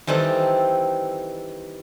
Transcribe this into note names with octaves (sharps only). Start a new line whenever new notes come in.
D#3 E3 G3 C4 A4